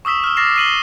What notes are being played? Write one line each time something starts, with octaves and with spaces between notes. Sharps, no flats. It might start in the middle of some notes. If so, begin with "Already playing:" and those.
C#6 D#6 E6 B6 E7
E6 F6
D6 F6 A6 A#6 C7 E7
C7 D#7 F#7 G7